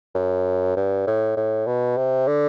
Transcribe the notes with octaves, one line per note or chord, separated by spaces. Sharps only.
F#2
G2
A2
A2
B2
C3
D3